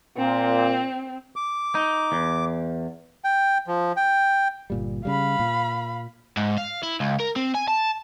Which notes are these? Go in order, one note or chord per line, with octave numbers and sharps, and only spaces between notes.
A#2 C4
D6
D#4
E2
G5
F3
G5
G1 A#2 G3
C#3 G3 F5 B5
A#2
G#2
F5
E4
C#2
A#4
C4
G#5
A5